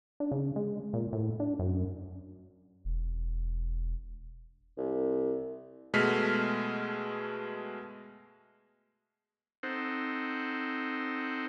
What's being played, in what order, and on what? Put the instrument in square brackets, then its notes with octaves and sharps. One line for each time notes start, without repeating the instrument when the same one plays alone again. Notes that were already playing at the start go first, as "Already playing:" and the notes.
[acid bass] D4
C#3
G#3
A#2
A2
D4
F#2
[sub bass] E1
[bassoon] C2
[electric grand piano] B2 G#3 A3 F6 B6 C7
[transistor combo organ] C4 D#4 A4 C5 F#5